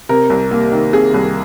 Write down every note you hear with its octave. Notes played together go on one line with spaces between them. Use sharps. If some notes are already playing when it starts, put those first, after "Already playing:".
C3 A#4
C2
A#3
D#3
C3 G#4
C2